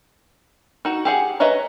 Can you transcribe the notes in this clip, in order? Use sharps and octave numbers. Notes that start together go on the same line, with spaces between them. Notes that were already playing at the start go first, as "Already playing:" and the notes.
D#4 F#4
G4 G#4 F#5
B4 C#5 D#5 E5 A#5